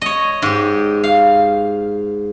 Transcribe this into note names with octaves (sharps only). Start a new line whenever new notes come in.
C#5 D#5
G#2 G4
F5